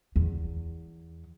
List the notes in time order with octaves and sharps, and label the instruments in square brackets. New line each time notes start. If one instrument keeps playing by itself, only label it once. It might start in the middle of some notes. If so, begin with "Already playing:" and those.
[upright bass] E2